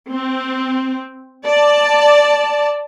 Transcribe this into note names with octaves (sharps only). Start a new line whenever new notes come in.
C4
D5 A5